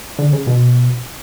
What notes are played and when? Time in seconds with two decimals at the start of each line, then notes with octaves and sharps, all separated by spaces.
0.19 D3
0.33 C#3
0.47 B2